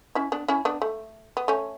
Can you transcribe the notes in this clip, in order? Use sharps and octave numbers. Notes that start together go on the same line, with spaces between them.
C#4 E4
B3 D4
C#4 E4
B3 D4
A3
B3
A3 C#4